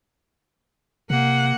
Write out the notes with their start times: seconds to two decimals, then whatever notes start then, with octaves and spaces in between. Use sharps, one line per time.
1.10 C3 A#3 F#5